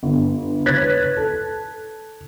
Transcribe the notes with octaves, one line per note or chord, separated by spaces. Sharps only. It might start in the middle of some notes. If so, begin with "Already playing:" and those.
G1
B4 C#5 F#6 G#6 A6 B6
A4